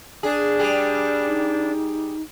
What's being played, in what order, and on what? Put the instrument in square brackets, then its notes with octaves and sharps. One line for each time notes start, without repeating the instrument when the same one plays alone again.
[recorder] D4 [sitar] G#4
[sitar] G3 G#4
[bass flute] D#4